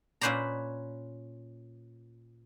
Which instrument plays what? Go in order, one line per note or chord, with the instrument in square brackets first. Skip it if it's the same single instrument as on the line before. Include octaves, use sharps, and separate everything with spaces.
[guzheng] A#2 C#4 B4 C5 D5 A#5